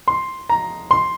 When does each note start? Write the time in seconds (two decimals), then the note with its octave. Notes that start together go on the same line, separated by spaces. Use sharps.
0.08 C6
0.50 A#5
0.91 C6